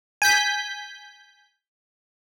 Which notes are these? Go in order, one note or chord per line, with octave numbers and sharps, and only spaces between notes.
G#5 G6 B6